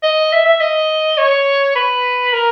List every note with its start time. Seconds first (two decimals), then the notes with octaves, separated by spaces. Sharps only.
0.03 D#5
0.32 E5
0.45 E5
0.60 D#5
1.18 C#5
1.75 B4
2.33 A#4